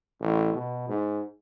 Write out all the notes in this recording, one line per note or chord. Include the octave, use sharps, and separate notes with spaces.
A1
B2
G#2